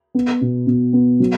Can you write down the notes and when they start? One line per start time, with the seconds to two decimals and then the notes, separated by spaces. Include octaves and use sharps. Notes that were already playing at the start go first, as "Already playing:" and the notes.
0.14 B3
0.41 B2
0.67 B2
0.93 B3
1.20 F#3